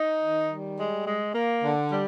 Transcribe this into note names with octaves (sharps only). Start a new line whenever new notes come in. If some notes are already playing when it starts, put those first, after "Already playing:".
Already playing: D#4
D#3
G3
G#3
G#3
A#3
D3
G3